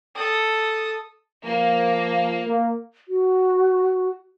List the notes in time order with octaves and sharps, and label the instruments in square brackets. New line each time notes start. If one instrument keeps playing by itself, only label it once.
[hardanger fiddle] A4 D#6
[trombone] F3 [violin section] A#3
[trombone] A#3
[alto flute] F#4